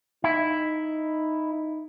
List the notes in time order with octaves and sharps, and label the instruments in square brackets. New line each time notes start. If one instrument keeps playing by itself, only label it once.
[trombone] D#4 [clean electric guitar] E4